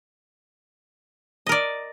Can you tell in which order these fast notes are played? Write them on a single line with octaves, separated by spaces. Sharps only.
D#5 A#4 D5